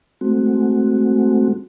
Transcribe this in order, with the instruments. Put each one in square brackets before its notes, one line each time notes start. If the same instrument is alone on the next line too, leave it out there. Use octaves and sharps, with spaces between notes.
[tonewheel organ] G#3 A3 C4 F#4